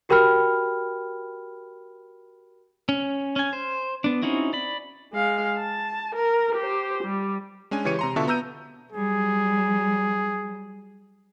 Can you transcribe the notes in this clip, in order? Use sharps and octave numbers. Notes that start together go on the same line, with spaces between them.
F#4 G4 A#4 G5 B5 F6
C#4
C#4 G#5
C5
B3 D4
C4 C#4 D#4 E4 F#4
D5 B5
G#3 F5
A5
A#4
G4 C5
G3
G#3 C#4 D4 G#5
C#3 E3 G4 C#5 C#7 D#7
C3 A#5 C6
B2 D3 F4 E5 A5 C#6
B3 A#5 E6 G6 D#7
F#3 G3 G#4